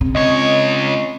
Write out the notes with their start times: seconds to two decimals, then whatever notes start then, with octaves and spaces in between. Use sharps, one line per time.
0.01 C#3 C4
0.15 C#2 C#5 D#5